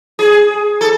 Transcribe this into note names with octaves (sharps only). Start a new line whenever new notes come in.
G#4
A4